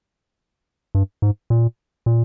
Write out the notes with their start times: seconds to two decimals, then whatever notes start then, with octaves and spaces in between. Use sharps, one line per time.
0.95 G2
1.22 G#2
1.50 A#2
2.06 A#2